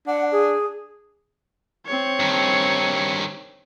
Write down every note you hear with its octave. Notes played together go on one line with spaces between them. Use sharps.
D4 F#5
G#4
C4 C#5
G2 D#3